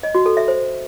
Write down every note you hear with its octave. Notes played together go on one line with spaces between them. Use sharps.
D#5
F#4
A4
E5
C5